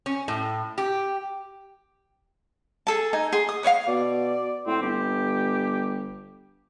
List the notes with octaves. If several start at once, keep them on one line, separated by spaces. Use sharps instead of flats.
C#4
A2
G4
G#4 A4 A5
D#4 G#5
G#4 C6
D#6
B4 C#5 D#5 F5
B2 D5
A2 C4
G1 G4